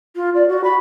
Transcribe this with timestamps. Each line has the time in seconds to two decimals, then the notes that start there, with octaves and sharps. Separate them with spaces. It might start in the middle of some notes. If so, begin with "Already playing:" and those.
0.16 F4
0.35 D5
0.48 F#4
0.64 B5